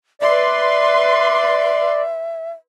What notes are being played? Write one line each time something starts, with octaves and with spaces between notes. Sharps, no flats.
B4 D5 E5 C6